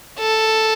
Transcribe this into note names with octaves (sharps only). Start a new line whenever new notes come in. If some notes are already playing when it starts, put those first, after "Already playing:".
A4